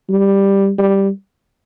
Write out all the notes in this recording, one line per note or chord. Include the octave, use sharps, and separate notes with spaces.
G3
G3